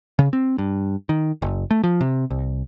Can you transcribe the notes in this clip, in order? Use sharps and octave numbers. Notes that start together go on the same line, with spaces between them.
C#3
C4
G2
D#3
F#1
A3
F3
C3
C2